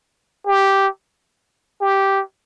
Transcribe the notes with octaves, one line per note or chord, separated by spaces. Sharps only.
G4
G4